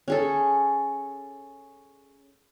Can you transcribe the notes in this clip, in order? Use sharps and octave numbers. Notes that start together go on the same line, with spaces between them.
C#4 G#4 A4